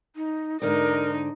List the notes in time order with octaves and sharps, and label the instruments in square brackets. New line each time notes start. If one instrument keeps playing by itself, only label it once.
[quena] D#4
[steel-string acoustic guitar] G#2 D3 D5 [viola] D#4 [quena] A#4